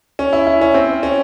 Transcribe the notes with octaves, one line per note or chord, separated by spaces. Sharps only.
C#4
E4
E4
C#4
C4
C#4